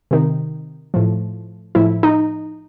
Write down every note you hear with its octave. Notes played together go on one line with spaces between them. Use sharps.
C3 D#3
A2 F3
A2 F3 E4
D#4